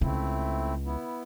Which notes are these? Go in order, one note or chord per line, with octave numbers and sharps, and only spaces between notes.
C#2 C#3 A3 C4 E4
B3 E4